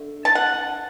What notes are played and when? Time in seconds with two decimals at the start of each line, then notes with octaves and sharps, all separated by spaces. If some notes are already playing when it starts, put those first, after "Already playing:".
Already playing: D3 A3
0.25 A5
0.35 F#5